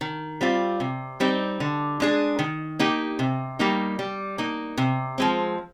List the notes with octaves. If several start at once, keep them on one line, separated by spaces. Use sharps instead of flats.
D#3
G3 C4 F4
C3
G3 C4 D#4
D3
G#3 D4 G#4
D#3
A#3 D#4 G4
C3
G3 A#3 D#4
G3
A#3 D#4
C3
F3 G#3 C4